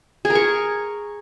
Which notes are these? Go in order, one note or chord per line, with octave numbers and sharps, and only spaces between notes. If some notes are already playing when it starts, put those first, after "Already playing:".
G#4
A#4
C#6